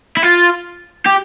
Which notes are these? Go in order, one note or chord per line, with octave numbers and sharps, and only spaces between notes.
E4
F4
G4